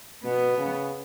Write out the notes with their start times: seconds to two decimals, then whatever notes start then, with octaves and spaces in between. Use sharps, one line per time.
0.25 B2 B3
0.58 C#3